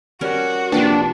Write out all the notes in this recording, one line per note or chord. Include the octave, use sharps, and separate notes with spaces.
G3 C#4 F#4 A#4
C3 F3 A#3 D4 B4 G5 A5